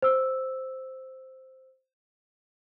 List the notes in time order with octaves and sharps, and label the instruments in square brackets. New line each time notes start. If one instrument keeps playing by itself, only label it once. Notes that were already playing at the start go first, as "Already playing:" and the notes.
[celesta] C5 E6